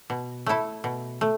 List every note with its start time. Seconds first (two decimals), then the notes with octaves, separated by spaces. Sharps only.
0.10 B2
0.46 A3 E4 A4
0.84 B2
1.21 A3